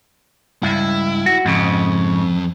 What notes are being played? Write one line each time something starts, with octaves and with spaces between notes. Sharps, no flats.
C#2 G2 E4
F#4
F2 G#2 C#3